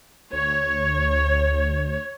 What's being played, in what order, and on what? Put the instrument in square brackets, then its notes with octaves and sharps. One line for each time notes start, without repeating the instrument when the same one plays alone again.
[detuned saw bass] D2 [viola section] C#5